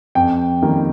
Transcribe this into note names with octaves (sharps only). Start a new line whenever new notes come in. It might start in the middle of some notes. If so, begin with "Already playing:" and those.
F2 G5
D#3 G3 A#3